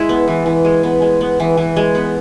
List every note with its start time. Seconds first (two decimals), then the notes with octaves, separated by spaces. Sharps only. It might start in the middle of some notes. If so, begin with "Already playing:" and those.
Already playing: G#3 E4
0.09 B3
0.28 E3
0.46 E3
0.65 G#3
0.83 B3
1.02 G#3
1.21 B3
1.40 E3
1.57 E3
1.76 G#3
1.95 B3